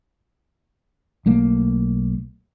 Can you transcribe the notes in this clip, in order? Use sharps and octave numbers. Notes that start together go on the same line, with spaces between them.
B1 A3 A#3